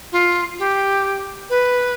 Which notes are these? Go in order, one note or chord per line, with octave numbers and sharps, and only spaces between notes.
F4
G4
B4